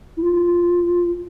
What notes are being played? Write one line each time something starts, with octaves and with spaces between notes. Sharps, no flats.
E4
F4